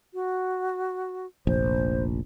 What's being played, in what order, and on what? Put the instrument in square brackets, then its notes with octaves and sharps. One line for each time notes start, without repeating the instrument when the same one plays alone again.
[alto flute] F#4
[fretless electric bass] F1 A#1 [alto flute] C5